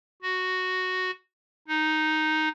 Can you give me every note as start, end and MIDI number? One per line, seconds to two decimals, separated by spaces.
0.22 1.11 66
1.68 2.49 63